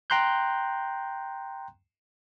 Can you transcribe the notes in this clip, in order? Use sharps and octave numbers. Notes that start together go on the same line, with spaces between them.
G5 A#5 C6 F#6 G6